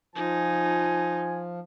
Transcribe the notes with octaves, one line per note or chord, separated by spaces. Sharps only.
F3 D#4 G#5